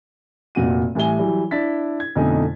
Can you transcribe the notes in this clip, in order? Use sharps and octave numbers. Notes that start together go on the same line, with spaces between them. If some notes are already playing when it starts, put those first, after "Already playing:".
F1 A#2 F#4 D#7
A2 E3 G3 E5 G#5 G7
E3 F#3 G3
D4 E4 A6 B6
G#6
F2 B2 D3 A3 D#4 G#5